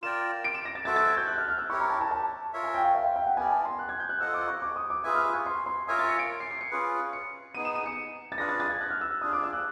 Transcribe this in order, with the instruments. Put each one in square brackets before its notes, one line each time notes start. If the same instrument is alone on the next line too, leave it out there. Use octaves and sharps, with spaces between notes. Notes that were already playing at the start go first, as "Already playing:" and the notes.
[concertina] F4 A#4 D5 G5 [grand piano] E7
[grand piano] D7
E7
A#6
A6
[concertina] F#4 A4 C5 E5 [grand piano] A6
[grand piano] A6
G#6
G6
F#6
F6
F6
E6
[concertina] E4 G4 A#4 C#5 [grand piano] C#6
[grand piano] A#5
A5
A5
A5
[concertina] F4 A#4 C#5 E5
[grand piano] G#5
G5
F5
E5
F5
G5
F#5
[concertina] B3 E4 G4 A#4 D5 [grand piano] G#5
[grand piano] A5
C6
F#6
G#6
G6
F#6
[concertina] F4 A4 C5 D#5 F#5 [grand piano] E6
[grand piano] D6
C#6
D6
D#6
D6
[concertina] F4 G#4 B4 E5 G#5 [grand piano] D#6
[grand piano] F6
D#6
C#6
C6
C6
[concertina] F4 A#4 C#5 E5 G#5 [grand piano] D#6
[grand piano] A6
C#7
D7
C7
C7
C#7
[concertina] C#4 F4 G#4 B4
[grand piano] C#7
[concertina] B3 D#4 G#4 [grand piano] D#7
[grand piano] E7
D#7
C#7
A6
[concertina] D4 F4 G#4 B4 [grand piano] A#6
[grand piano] A6
A6
G#6
F#6
F6
E6
[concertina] D4 F4 G#4 [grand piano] D#6
[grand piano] D6
E6
F#6